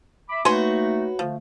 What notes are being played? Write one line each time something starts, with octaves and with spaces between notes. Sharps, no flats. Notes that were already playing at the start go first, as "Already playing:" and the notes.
E5 B5 D6
A3 A#3 D#4 F#4 B4 C#5 G#5 C6
D3 F3 A3